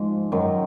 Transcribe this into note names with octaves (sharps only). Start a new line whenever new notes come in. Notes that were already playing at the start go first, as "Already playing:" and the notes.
Already playing: G#2 F3 G#3
F#2 D#3 F#3